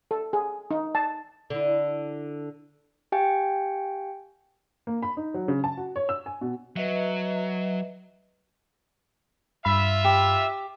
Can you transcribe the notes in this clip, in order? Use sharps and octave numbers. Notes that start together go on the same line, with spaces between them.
A4
G#4
D#4
A5
D3 E4
G4 F5 G5 G#5
A#3
B5
D#4
F#3
C#3
A5
F#4
C#5
E6
G#5
B2
F#3 B4 D#5 E5
G2 F4 E5 B5
G4